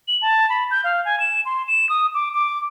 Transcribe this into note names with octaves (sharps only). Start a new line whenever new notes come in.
F#7
A5
B5
G6
F5
G#5
E7
C6
E7
D#6
D6
D6